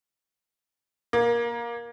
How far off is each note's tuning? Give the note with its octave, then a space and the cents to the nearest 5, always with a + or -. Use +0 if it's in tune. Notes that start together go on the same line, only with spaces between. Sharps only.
A#3 +20